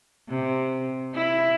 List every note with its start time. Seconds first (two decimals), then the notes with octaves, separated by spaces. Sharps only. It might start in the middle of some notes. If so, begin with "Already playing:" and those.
0.29 C3
1.15 E4